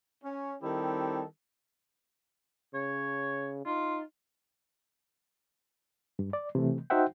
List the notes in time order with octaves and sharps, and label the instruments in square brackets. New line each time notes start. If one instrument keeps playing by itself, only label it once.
[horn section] C#4
D#3 G3 C4 E4 G4 A4
[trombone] C#3 [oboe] C#5
[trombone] D#4 [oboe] F4
[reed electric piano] G2
D5
C3 E3 A3
D#4 F#4 C5 E5 F#5 G5